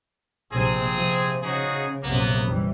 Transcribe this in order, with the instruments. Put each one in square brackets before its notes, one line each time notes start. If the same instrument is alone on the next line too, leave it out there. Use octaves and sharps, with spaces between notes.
[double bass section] A#1 C3 [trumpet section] C4 G#4
[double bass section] C3 F3
[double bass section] C#3 [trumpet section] D#4 F#4 G#4
[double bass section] A#1 F#2 C3 [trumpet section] A#3 B3
[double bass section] F2 E3 G3